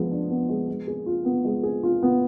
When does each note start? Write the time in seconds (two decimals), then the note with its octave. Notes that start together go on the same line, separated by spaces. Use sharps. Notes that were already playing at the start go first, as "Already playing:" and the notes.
Already playing: F3 G#3 B3
0.11 D4
0.30 B3
0.49 G#3
0.68 G#3
0.88 G#4
1.06 F4
1.25 B3
1.45 G#3
1.63 G#4
1.83 F4
2.03 B3